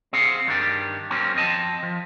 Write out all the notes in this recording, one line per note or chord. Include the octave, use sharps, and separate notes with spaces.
C4 G#4 F5 F#5
G2 D#3 G3 D4 G4
F#3 A#3 C4 C#4
F2 C4 D#5 A5
F3